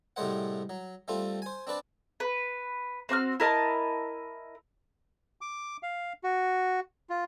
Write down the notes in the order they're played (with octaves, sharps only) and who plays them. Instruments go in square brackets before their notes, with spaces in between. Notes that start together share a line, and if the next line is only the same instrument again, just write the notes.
[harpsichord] A2 C3 G3 G#3 C5 F#5
F#3
G3 A3 C4 F4
C5 G#5
C4 D4 B4 D5
[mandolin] B4
C4 F#4 C#6 F6
E4 A#4 D#5 A5
[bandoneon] D6
F5
F#4
F4